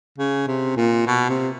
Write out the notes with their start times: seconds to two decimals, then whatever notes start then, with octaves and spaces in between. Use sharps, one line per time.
0.18 C#3
0.47 C3
0.77 A#2
1.07 B2
1.29 C3